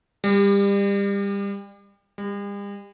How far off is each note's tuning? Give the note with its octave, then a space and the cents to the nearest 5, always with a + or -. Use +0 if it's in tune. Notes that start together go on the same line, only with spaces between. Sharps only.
G3 +30
G3 +45